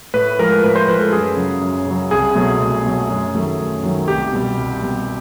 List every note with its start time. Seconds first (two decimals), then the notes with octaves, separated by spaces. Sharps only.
0.14 A2 B4
0.39 F3 G#3 A#4
0.63 A2 B4
0.75 C5
0.88 F3 G#3 B4
1.01 A4
1.12 F#2 G#4
1.37 C#3 F#3
1.61 F#2
1.86 C#3 F#3
2.11 C2 G#4
2.35 B2 F#3 A3
2.60 C2
2.85 B2 F#3 A3
3.10 F#2
3.34 D#3 F#3 A3
3.59 F#2
3.83 D#3 F#3 A3
4.08 C2 G4
4.32 B2 G3
4.57 C2
4.82 B2 G3